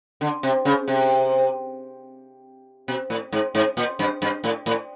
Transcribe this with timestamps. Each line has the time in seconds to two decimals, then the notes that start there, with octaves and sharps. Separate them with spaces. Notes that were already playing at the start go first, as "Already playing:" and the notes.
0.21 D3
0.43 C3
0.65 C#3
0.88 C3
2.88 B2
3.10 A2
3.33 G#2
3.55 G#2
3.77 A#2
3.99 G2
4.22 G2
4.44 A2
4.66 A2